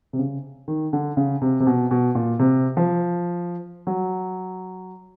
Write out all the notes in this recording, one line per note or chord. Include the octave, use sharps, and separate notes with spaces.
C3
C#3
D#3
D3
C#3
C3
C3
B2
B2
A#2
C3
F3
F#3